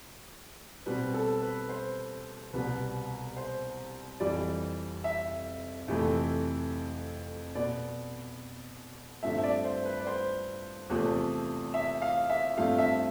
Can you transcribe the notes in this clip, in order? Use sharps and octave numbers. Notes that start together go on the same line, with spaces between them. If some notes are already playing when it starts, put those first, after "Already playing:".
B2 G3 C4 B4
A4
B4
C5
C2 B2 G3 B3 B4
C5
F2 E3 G3 D5
E5
F2 C3 E3 A3
B2 B3 D5
G2 D3 F3 A3 C4 E5
E5
D5
C5
B4
D5
C5
E2 C3 F3 A3
E5
F5
E5
G2 F3 A3 C4 F5
E5